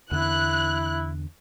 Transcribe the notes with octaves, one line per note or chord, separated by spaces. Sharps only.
E2 D3 E4 F#6